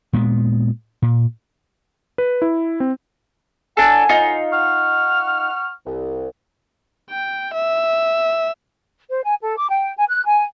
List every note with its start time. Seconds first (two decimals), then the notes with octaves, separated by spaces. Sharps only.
0.13 A#2 G#3 B3
1.02 A#2
2.18 B4
2.42 E4
2.80 C4
3.77 A2 D4 A4 F#5 G#5
4.09 D#4 F4
4.52 F#5 C#6 F6
5.86 C2
7.11 G5
7.54 E5
9.10 C5
9.24 G#5
9.42 A4
9.57 D6
9.70 G5
9.98 G#5
10.10 F#6
10.26 G#5